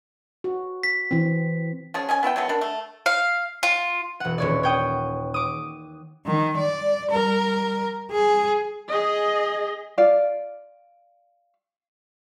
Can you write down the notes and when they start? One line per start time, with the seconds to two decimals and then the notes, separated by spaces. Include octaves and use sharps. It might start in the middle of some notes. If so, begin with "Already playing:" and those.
0.44 F#4
0.83 B6
1.11 E3 C4
1.94 F3 G#3 C#4 G#4
2.09 C#4 D#5 G#5
2.23 B3 E4 F4 G5
2.36 F#3 A3 B3
2.49 D4 A#4 B5
2.61 A3
3.06 F5
3.63 F4
4.20 E1 F#5
4.38 D#1 C#5 D5
4.63 C#5 G5 D#6
5.34 D6 D#6
6.26 D#3
6.57 D5
7.11 G3 A#4
8.11 G#4
8.89 G#4 D#5
9.98 F4 D5 F5